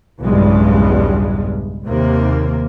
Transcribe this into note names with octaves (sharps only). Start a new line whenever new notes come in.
B1 E2 G2 C#3 G3 G#3
D#2 C3 A#3